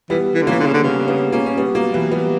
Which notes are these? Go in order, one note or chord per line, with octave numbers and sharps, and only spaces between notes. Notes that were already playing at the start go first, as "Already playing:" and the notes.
E3 G3 B3
E3
D3
E3 A#3 C#4
D3
C#3
D3
C#3 G3 B3
G3 B3
A#3 C#4
C#4
G3 B3
F#3 A#3
E3 G3
G3 B3